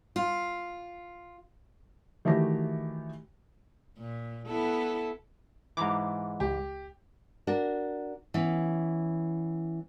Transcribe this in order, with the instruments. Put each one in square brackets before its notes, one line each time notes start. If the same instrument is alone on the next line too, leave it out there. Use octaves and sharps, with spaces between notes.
[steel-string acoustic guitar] F4
[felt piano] D#3 E3 A3 F#4 G4 A#6
[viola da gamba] A#2
B3 E4 A4
[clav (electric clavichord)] G#2 E3 [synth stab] A#5 D6
[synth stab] C#2 [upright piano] G4
[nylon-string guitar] D4 F#4 A#4
E3 B3 C#4